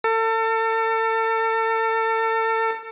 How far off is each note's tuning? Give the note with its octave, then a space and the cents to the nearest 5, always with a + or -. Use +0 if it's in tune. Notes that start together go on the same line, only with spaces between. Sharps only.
A4 +35